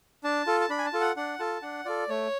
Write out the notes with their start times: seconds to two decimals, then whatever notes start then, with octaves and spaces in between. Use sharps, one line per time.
0.24 D4 A5
0.47 F4 A4
0.61 A5
0.70 D4 B5
0.78 G#5
0.85 A5
0.93 F4 A4
1.01 F#5
1.17 D4 F#5
1.39 F4 A4 A5
1.62 D4 F#5
1.85 F4 A4 D5
2.09 A3 C#5